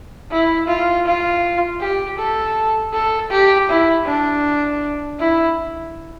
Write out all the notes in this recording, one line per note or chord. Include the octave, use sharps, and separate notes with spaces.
E4
F4
F4
G4
A4
A4
G4
E4
D4
E4